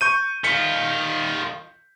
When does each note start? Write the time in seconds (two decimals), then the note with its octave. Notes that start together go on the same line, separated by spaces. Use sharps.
0.01 C#6 G6 D#7
0.44 D#3 F4 B6 C#7